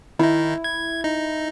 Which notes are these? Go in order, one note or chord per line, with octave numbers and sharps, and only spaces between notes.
D#3 D#4 E4
G#6
D#4